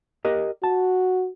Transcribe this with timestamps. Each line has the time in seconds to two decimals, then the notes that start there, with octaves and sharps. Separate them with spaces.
0.25 G4 A#4 D#5
0.64 F#4 A5